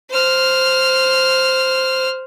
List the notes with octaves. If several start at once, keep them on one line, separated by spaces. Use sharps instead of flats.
C5 F6